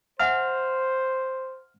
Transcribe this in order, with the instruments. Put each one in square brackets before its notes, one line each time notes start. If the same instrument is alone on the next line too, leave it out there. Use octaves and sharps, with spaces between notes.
[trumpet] C5 [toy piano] E5 F#5 G#5 [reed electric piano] F6